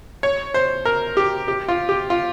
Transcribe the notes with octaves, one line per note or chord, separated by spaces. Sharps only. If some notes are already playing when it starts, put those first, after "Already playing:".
C#5
C5
A#4
G4
G4
F4
G4
F4